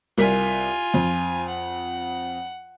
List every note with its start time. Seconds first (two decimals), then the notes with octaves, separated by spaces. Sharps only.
0.18 C2 F4 A#4 G#5 B6
0.94 F2
1.48 F#5